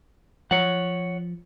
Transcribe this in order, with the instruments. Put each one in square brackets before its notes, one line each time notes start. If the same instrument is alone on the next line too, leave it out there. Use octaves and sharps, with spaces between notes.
[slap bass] F3 [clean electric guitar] C#5 F#5